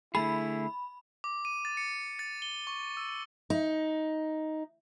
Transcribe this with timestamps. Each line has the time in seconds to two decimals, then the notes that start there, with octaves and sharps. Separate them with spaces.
0.15 D3 A3 E4 G#4 B5
1.24 D6
1.45 D#7
1.65 A6
1.77 C#7
2.19 A6
2.42 G7
2.67 C#6
2.97 E6
3.50 D#4